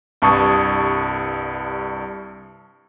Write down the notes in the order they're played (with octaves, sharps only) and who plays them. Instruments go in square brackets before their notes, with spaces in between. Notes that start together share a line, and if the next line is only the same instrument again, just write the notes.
[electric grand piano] C2 G2 A5 C#6 D#6 G#6